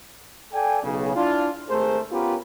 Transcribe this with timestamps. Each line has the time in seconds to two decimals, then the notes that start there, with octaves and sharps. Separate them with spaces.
0.53 A4 D5 G5 G#5
0.83 B1 C#3
1.15 D4 E4 F4
1.69 G#1 A3 G#4 A#4 C5
2.12 B3 C#4 F4 G4 A#4 B4